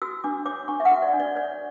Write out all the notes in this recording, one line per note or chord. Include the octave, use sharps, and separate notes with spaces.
F#4 E6
D4 D6
C#5 D6
D4 C#6
E5
F#5
F#4
D5
D4
D5
C#5 D5